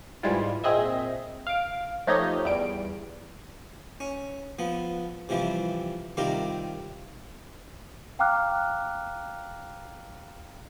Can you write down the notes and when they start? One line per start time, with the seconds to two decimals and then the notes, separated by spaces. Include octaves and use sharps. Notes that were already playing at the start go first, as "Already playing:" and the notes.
0.23 G#2 E3 G3 G#3 E4 F4
0.64 A#2 C4 G#4 D#5 E5
1.47 F5 D7
2.07 F3 A3 D#4 G4 C#5 D#5
2.45 E2 G3 D7
4.00 C#4
4.59 F3 B3
5.29 C3 E3 F3 G3
6.17 C3 D#3 G3 F4 G4 A#4
8.19 F5 G5 A#5 D6 F6 F#6